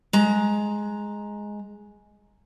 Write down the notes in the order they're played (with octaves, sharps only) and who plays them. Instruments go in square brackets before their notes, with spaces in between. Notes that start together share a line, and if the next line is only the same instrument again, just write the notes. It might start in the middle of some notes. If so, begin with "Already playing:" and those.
[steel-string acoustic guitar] G#3 A#5